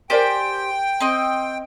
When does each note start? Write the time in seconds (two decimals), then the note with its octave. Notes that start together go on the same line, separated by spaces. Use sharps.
0.10 G4 A#4 C5 D5 G5 G#5
1.00 C4 D#5